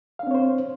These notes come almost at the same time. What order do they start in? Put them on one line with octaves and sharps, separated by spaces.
F5 D4 C4 C#5 C5